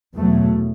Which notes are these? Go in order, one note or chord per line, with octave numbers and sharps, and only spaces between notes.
E2 B2 F#3 A3